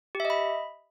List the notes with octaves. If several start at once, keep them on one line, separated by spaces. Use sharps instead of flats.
G4
E5
D#5
B5